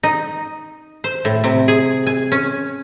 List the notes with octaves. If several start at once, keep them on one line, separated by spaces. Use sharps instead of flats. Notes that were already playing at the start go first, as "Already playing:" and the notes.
D#4
C5
A2
C3
G#4
G#5
C#4